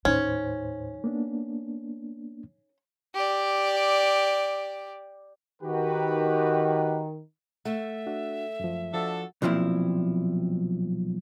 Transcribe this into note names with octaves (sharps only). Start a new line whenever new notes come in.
D#2 A2 C#4 D#4 C5
A#3 B3 D4
G4 D5
D#3 F#4 G4 B4
A3 E5 F#5
D4 F#4 F#5
F#2 F3
F3 D4 F4 F#4 A4
B1 A#2 F3 C4 E4